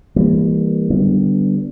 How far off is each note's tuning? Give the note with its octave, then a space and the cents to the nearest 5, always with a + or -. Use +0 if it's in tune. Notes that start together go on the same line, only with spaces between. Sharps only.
E3 +0 G3 +35 A#3 +0
D3 +0 G3 -25 B3 +0